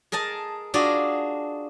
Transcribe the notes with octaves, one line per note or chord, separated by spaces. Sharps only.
G#4 A#4 D#5 A5
D4 F4 F#4 G#4 D5 D#5